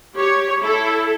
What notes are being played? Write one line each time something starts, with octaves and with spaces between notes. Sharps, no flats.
G4 C#5
E4 A4